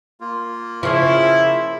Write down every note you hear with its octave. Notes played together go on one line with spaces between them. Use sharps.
A#3 F4
C#3 F3 E4